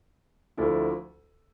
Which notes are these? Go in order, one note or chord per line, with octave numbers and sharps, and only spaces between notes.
D2 D3 F3 A3 E4